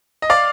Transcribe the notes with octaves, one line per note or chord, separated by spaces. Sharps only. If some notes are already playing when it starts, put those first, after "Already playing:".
D#5
D5 F5